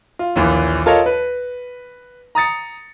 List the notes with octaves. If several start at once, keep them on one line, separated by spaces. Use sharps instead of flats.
F4
A#1 D#2 A#2 E3
F4 A4 A#4 C#5 D#5
B4
A#5 D#6 A6 C#7